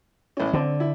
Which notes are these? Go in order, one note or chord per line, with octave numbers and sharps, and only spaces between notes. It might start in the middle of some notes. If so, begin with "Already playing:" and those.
A1 C#4
D3 C4
E4